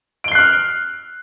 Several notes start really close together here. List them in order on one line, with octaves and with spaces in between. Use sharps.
D7 G7 C7 F#6 F6